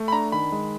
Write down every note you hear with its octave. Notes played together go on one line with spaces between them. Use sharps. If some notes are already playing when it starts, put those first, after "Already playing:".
Already playing: A3
B5
D4 A#5
D#3 B5
G#3